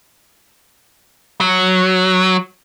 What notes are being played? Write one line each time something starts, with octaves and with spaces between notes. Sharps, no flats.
F#3